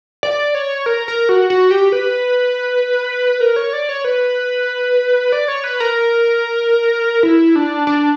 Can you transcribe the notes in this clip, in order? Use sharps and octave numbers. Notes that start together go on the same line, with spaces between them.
D5
C#5
A#4
A#4
F#4
F#4
G4
B4
A#4
C#5
D5
C#5
B4
D5
C#5
B4
A#4
E4
D4
D4